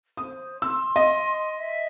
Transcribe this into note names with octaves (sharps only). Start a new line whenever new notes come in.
C5 D#6
C6 E6
D#5
E5